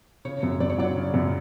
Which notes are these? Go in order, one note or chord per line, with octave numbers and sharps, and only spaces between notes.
C#3 C#5
F#2
F#2 D5
C#5
F#3 D5
C#3
F#2